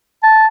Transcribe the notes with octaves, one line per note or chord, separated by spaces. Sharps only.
A5